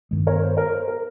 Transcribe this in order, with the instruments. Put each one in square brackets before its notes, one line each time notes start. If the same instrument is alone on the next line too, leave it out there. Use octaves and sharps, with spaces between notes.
[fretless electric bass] G2 D#3 G#3
[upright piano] A#4 C#5
C5
A#4 C#5
C5
A#4